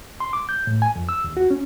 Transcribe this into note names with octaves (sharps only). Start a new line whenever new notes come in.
C6
D6
G6
A2
G#5
F2
E6
D#2
F#4
C#4